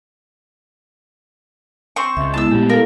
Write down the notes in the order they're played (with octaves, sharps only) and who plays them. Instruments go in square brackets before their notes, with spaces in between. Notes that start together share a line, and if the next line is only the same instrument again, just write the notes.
[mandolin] C4 C5 C#6
[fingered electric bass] C#2 [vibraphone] E5
[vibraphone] G#3 B3 E4 [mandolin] A5 E6
[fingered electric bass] A#2 A3 B3 [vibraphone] G#3 G4
[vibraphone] E4 A4 F5 [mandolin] A#4